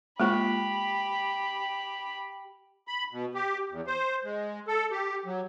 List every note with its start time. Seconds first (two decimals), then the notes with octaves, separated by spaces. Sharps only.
0.20 G#3 A#3 F4 G4 B5
2.88 B5
3.12 B2
3.34 G4
3.71 E2
3.87 C5
4.24 G#3
4.68 A4
4.91 G4
5.25 F#3